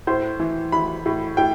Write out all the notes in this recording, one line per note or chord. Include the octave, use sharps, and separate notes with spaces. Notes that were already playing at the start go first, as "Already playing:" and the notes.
A2 C5
E3
E3 B5
A2
A2 G5